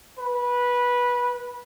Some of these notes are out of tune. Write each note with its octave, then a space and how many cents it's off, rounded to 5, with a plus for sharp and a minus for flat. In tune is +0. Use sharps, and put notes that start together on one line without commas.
B4 -15